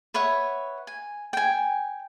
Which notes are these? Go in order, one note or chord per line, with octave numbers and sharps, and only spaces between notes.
B4 C#5 E5 F#5
G#5
G5 G#5